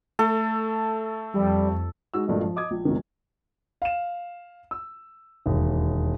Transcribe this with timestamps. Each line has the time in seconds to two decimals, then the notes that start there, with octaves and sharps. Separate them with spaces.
0.19 A3 A4
1.34 F2 G3
2.14 G#3 D#4 F#4 E6
2.27 G#1 G2 A#2 A3 D4 D#5
2.41 F3
2.56 D#5 D6 D#6 G#6
2.71 A#1
2.85 E1 A#1 C3 D#3
3.82 F5 E7
4.71 E6
5.46 E1 D#2